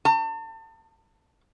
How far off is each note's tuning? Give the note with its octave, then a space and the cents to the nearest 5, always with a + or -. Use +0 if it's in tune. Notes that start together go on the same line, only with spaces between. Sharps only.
A5 +35